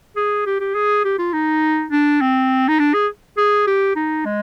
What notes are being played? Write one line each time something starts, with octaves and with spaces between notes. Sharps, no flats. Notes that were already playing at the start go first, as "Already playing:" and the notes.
G#4
G4
G4
G#4
G4
F4
D#4
D4
C4
D#4
D4
G#4
G#4
G4
D#4
G#3